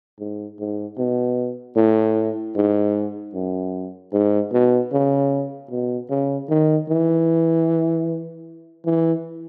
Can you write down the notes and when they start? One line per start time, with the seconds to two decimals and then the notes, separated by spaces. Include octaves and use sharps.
0.19 G#2
0.59 G#2
0.98 B2
1.76 A2
2.55 G#2
3.34 F#2
4.13 G#2
4.52 B2
4.92 C#3
5.70 B2
6.10 C#3
6.49 D#3
6.89 E3
8.85 E3